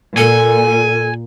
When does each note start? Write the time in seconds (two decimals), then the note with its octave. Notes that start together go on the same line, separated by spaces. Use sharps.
0.18 A#2 A4 G#5